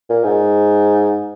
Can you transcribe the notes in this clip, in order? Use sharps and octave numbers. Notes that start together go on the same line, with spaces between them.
A#2
G#2